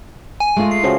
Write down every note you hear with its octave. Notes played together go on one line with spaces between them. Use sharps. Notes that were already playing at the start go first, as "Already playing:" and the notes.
G#5
G#3 A3 F4
C7
C#3 F3 F#4